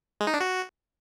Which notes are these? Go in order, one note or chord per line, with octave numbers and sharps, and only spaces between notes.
G#3
D#4
D4
F#4